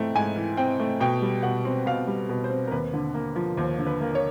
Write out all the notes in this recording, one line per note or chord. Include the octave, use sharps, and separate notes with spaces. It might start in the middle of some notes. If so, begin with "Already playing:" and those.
Already playing: G#2 E3 A3 C4 G5
G#2 G#5
E3
C4 G5
A3
B2 G5
G3
B2 F#5
C4
B2 F5
G3
B2
C5
C4
A#4
D#2 B4
D3
A#3
F3
D#2 C5
D3
B4
A#3
C#5